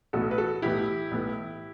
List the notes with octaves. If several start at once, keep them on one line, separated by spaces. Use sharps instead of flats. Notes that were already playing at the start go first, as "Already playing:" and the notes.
B1 A2 E3 B3 F#4 A4
B4
F#4 A4
B1 A2 E3 B3 E4 G4
B1 A2 E3 B3